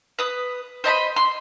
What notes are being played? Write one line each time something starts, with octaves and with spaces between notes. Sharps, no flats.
B4 D#6
C5 D#5 A#5 B5
C6